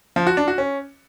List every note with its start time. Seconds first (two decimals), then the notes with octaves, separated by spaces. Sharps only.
0.16 F3
0.27 F#4
0.37 D4
0.48 F#4
0.58 C#4